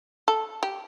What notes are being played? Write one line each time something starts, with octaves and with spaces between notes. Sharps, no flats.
A4
G4